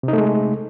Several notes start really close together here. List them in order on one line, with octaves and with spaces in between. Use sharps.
C3 D#4 A3 G#3